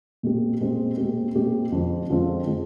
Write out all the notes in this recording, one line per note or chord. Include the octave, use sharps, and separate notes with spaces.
A#2 G#3 C4 G4
A#2 G#3 C4 G4
A#2 G#3 C4 G4
A#2 G#3 C4 G4
F2 D3 G#3 C4 F4
F2 D3 G#3 C4 F4
D3 G#3 C4 F4